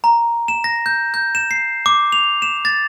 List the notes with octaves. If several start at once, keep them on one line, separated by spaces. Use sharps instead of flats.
A#5
E7
A#6
G6
G6
E7
C7
D6
F7
E7
A6